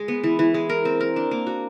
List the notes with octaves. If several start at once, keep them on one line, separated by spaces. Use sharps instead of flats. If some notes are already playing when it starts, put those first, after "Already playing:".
Already playing: G#3
B3
E3
E3
G#3
A#4
C4
A#4
D4
A#3
F#4